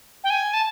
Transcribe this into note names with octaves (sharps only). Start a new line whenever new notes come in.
G5
G#5
A5